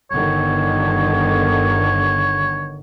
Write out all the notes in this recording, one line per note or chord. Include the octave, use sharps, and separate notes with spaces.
G1 D3 D#3 C#5